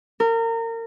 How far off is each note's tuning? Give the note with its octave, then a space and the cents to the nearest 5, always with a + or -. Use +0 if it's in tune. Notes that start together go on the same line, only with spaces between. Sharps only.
A#4 -30